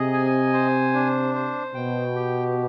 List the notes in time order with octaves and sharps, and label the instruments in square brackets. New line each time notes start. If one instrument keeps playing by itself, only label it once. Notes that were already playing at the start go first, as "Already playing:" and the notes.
Already playing: [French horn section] C3 [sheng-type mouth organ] G#4 D#5
[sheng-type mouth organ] G#5
C5
D4
C5
[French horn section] B2 [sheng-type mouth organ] G5
[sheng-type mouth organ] G4